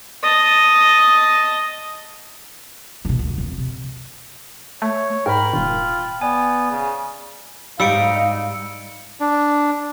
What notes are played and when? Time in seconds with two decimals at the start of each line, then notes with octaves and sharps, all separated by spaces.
0.23 D#5 A5
3.05 C3 D4
3.19 D2
3.38 E1 F2
3.58 C3
4.82 A3 C#5
5.26 G#2 A#4 G5 B5
5.53 D#1 F4
6.21 B3 D5 G#5
6.70 C#3
7.80 G#2 G3 D#4 F5 E6 C#7 D7
9.20 D4